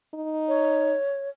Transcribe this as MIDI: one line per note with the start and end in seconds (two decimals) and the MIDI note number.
0.14 0.95 63
0.48 1.29 73